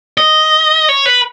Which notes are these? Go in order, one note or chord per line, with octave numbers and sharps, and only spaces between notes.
D#5
C#5
B4